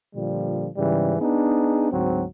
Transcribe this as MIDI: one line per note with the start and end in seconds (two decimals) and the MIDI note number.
0.16 0.68 46
0.16 0.68 50
0.16 0.68 53
0.16 0.68 55
0.77 1.16 44
0.77 1.16 49
0.77 1.16 52
0.77 1.16 55
1.21 1.91 59
1.21 1.91 62
1.21 1.91 63
1.21 1.91 68
1.91 2.25 38
1.91 2.25 44
1.91 2.25 54
1.91 2.25 60